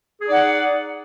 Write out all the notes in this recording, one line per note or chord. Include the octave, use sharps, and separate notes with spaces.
D#4 G#4 D5 F#5